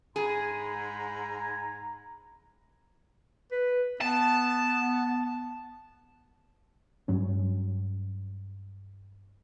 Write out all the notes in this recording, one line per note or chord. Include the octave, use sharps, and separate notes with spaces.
G#2 G#4 G#5 A#5 B5
B4
B3 A5
G2 F#3 C#4